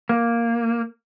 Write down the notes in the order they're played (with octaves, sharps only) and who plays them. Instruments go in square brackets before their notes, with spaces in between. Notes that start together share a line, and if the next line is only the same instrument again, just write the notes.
[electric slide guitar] A#3